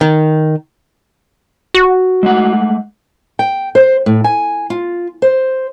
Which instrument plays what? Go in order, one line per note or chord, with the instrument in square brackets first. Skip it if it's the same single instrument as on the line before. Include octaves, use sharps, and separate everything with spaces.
[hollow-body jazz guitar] D#3
[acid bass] F#4
[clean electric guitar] G#3 A3 F#5
[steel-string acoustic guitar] G5
C5
A2
G#5
F4
C5